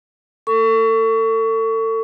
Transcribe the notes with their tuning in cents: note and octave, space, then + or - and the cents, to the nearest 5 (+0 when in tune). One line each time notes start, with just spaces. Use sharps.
A4 +30 C#6 +25